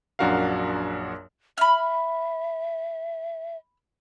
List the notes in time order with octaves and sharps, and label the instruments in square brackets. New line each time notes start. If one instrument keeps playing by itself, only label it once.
[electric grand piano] A#1 F#2 D4 F#4 A#4 F5
[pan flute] E5 [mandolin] B5 F6